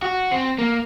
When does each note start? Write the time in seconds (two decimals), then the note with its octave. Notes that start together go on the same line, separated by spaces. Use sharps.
0.02 F#4
0.32 C4
0.59 A#3